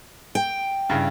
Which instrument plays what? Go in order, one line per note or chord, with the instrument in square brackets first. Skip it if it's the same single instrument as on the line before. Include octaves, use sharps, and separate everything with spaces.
[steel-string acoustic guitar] G5
[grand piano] G2 C#3 E4